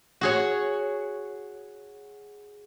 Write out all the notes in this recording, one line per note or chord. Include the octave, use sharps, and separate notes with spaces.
F#4 G#4 C#5